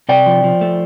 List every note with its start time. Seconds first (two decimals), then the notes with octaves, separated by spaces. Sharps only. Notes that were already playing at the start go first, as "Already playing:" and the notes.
0.09 C3 D5 G5
0.26 F3
0.44 F3
0.61 A3